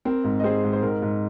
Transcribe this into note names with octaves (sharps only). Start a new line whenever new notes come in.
C4 A#4
G#2
D#5
C4 G#4 C5
G#2
C5
G#2 A#4
G#2